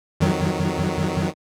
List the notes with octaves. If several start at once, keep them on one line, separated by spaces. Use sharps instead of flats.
F2 D#3 F#3